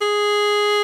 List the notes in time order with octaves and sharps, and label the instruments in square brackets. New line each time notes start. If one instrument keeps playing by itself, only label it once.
[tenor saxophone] G#4